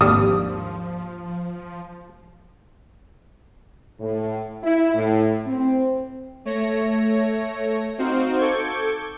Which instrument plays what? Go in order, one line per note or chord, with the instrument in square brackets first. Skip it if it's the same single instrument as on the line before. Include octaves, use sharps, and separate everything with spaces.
[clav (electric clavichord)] G#1 D#2 [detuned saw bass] F3 [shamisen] G3 A#3 D4 [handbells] D#6
[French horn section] A2
E4
A2
C4
[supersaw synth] A3 C#5 A#6
C4 D#4 F#4 C5 F5
A4 C#6 D6 G6 G#6